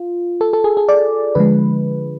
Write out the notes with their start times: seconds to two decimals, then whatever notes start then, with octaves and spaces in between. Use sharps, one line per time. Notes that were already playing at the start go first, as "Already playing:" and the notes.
Already playing: F4
0.41 A4
0.53 A4
0.64 G#4
0.77 G#4
0.88 D5
1.35 D3 F3 G#3 B4